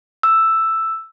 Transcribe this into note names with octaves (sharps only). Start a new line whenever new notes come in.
E6